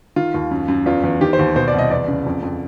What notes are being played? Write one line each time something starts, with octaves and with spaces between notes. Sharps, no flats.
D#3 F4
D#2
F#2
F#2
E2 F4
E2
D#3 G4
C5
D#2
B2 C5
D5
C2 D#5
E2 D5
C#3
F2
F2